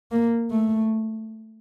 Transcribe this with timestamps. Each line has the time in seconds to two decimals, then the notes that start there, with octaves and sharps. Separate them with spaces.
0.11 A#3
0.51 A3